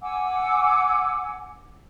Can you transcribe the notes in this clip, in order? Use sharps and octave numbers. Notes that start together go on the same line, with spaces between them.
F#5 G#5 D6 E6